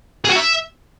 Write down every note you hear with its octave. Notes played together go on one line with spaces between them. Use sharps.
G#4
F#4
E5